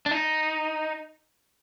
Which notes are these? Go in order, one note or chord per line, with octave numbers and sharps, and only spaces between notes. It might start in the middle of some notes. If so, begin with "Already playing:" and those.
D4
D#4